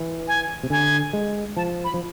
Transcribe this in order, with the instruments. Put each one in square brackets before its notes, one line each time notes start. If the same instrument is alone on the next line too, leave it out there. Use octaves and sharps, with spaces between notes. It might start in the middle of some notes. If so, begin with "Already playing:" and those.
Already playing: [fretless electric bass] E3
[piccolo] G#5
[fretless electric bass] C3
[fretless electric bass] D3 [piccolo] G#5
[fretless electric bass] G#3
[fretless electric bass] F3 [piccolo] A5
[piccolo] B5
[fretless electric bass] F3